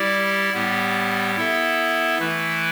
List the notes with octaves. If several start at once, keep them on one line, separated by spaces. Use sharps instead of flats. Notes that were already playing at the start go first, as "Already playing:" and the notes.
Already playing: G3 E4 G4 D5
A2 G3 B3 G4
B3 E4 A4 E5
E3 A3 E4 B4